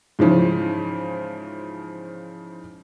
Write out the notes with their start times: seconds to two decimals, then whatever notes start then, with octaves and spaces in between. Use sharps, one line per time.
0.19 G#2 C#3 E3 F3